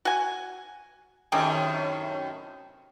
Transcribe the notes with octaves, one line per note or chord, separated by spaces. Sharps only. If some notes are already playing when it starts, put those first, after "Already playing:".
F#4 G#5
F#2 A2 C3 D#3 G4 G#4